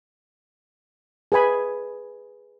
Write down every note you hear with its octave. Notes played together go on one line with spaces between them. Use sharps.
G#4 B4 G#5 B5